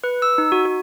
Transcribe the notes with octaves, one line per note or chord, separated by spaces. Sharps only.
B4
E6
D#4
F#4
F#4